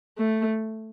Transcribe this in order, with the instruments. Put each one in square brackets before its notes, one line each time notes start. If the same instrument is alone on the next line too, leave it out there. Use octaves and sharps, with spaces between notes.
[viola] A3